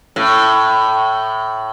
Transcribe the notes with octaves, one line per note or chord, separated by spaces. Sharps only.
A2